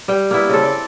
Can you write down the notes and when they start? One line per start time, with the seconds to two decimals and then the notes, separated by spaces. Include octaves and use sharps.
0.08 G3 G5
0.31 A#3 B3 E4
0.49 C#3 C4 A4
0.63 D5